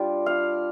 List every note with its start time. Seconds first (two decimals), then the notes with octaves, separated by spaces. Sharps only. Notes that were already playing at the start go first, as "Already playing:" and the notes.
Already playing: G3 D4 F4
0.26 F5